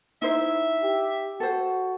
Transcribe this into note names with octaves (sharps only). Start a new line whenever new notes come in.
D#4 E4 C5 E5
G4
F#4 A4 C5